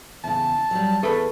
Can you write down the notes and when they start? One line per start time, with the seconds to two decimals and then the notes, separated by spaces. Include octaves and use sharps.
0.24 E2 C#3 A5
0.71 F#3 G3
1.03 E2 A3 G#4 A4 B4